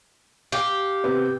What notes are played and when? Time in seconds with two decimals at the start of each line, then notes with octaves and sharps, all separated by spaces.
0.52 G4 F5
1.04 C3 B3 C4